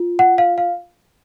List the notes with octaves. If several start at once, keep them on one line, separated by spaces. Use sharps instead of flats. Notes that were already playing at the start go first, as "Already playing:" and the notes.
Already playing: F4
F#5
F5
F5